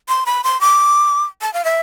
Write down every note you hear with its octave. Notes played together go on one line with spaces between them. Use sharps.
C6
B5
C6
D6
A5
F5
E5